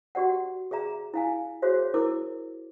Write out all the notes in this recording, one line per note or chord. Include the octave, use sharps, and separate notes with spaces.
F#4 G4 D5 F#5
G#4 D5 E5 A#5
E4 F5 G#5
F#4 G#4 C5 C#5 E5
E4 A#4 D6